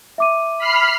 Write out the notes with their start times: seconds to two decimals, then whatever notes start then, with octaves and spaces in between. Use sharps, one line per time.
0.18 E5 D6 D#7
0.58 B5 F6 C7